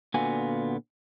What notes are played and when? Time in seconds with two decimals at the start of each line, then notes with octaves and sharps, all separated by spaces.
0.14 A#2 D3 B3 F4 F#4 G#5